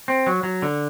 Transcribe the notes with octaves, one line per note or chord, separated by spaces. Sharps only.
C4
F#3
F#3
D3